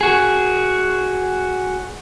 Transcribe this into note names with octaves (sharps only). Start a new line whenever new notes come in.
F#4 G#4